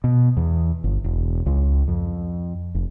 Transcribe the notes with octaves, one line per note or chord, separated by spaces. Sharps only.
B2
E2
G1
E1
C#2
F2
F1